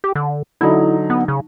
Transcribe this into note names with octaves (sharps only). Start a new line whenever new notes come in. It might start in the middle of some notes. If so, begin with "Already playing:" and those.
G4
D3
D3 F#3 D#4 E4
B3
C#3